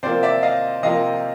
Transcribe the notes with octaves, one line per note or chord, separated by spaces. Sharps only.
C3 F3 A#3 C5 D5
D5 E5
D#5 F5
C3 F3 A#3 D#5 F5